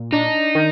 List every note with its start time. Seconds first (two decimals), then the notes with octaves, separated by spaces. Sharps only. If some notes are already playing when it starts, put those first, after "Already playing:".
Already playing: A#2
0.12 D4 D#4
0.55 D#3